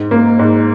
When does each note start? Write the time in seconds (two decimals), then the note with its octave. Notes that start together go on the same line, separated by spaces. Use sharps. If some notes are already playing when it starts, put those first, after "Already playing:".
Already playing: G#2
0.11 A#3
0.39 G#2